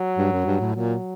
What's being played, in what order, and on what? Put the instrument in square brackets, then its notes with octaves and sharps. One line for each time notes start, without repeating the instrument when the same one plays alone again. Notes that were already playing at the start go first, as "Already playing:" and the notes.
Already playing: [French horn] F#3
[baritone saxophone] G2
F#2
G2
A2
[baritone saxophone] A#2 [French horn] F#3